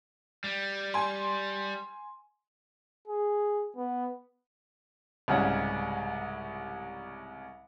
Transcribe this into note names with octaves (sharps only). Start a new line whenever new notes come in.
G3
G#5 C6
G#4
B3
C2 G#2 C#3 G3 C#5 F#5